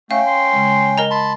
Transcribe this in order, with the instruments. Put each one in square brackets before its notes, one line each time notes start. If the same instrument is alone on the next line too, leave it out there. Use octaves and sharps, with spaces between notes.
[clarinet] A3 [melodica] C#4 G5 [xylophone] F5
[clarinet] C6
[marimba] C#3 G#3
[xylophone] A#4 D#5 A#5
[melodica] A5 B5 C6